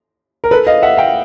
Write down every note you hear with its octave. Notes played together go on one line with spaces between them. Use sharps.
A#4
A4 B4
D#5 F5
E5 F#5
F5 G5